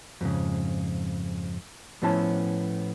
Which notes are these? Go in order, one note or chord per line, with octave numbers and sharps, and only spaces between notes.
F2 G#2 C#3
A2 F3 B3 C#4 E4 A5